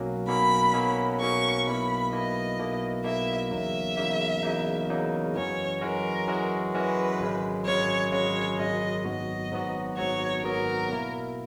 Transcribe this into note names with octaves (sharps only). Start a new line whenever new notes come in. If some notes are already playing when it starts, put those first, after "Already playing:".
Already playing: B1 B2 F#3 A#3 C#4
B1 B2 F#3 A#3 C#4 B5
B1 B2 F#3 A#3 C#4
B1 B2 F#3 A#3 C#4 C#6
B1 B2 A#3 E4 B5
B1 B2 A#3 E4 D#5
B1 B2 A#3 E4
B1 B2 A#3 E4 E5
E2 C#3 F#3 A#3 D#4 E5
E2 C#3 F#3 A#3 D#4
E2 C#3 F#3 A#3 D#4
E2 C#3 F#3 A#3 D#4
F#2 E3 G#3 C#4 F#4 C#5
F#2 E3 G#3 C#4 F#4 A#4
F#2 E3 G#3 C#4 F#4
F#2 E3 G#3 C#4 F#4 B4
G#1 F#2 C#3 G#3
G#1 F#2 C#3 G#3 C#5
G#1 F#2 C#3 G#3 C#5
G#1 F#2 C#3 G#3 D#5
G#1 G#2 F#3 B3 F#4 D#5
G#1 G#2 F#3 B3 F#4
G#1 G#2 F#3 B3 F#4 C#5
G#1 G#2 F#3 B3 F#4 A#4
B2 A#3 E4